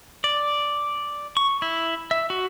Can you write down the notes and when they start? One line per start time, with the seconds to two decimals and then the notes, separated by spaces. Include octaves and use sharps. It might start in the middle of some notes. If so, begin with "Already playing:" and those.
0.24 D5
1.37 C#6
1.62 E4
2.11 E5
2.30 F#4